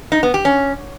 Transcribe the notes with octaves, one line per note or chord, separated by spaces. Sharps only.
D#4
B3
G4
C#4